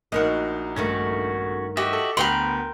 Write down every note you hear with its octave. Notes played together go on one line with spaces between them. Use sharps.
A#1 D#4 F#4 A#4 D#5
G2 D#3 A3 C#4 F#4
F#4 G4 D#5 E5
A4
D2 B3 A#4 G5 B5 C6